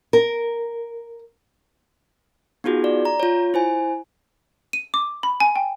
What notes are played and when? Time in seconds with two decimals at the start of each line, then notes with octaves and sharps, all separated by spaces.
0.13 A#4
2.64 B3 D#4 F4 F#4 G#4
2.84 D5
3.05 A#5
3.20 F4 C#5
3.54 E4 C5 G#5
4.73 D#7
4.94 D6
5.23 B5
5.40 G#5
5.56 G5